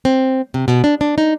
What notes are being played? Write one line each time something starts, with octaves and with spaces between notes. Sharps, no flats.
C4
C3
B2
D4
D4
D#4